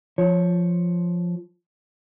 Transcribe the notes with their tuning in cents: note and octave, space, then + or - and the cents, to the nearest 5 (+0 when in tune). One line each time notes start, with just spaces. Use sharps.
F3 +0 C#5 +0